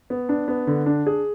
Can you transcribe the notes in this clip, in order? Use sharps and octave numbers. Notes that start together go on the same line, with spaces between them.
B3
D4
B3
D3
D4
G#4